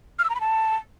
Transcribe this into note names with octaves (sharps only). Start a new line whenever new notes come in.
F6
E6
A#5
B5
A5